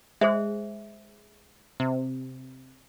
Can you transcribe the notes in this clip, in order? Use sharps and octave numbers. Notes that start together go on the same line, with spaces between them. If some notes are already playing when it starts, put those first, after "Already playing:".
G#3 G#4 C5 E5
C3